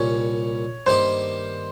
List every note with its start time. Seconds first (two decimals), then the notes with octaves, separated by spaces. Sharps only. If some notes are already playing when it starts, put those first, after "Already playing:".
Already playing: C2 A#2 G3 C#4 C#5
0.86 G2 D#3 A#3 D#4 G4 C5